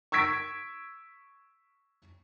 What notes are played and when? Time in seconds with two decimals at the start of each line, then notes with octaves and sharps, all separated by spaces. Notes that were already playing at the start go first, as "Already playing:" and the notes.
0.12 C#6 E6 G#6 B6 D7